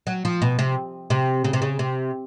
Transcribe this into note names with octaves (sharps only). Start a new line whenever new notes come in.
F#3
F3
B2
C3
C3
C#3
C3
C#3
C3